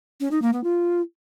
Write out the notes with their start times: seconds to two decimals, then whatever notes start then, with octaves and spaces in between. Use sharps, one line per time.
0.20 C#4
0.31 D#4
0.42 A#3
0.53 B3
0.64 F4